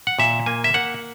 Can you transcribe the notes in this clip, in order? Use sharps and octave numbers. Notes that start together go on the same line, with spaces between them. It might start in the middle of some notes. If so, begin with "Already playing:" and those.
F#5
A#2 E5
A#3 G#5
E5
A#3 F#5